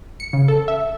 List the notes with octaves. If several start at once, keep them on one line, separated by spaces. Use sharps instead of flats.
C#7
C#3
A4
E5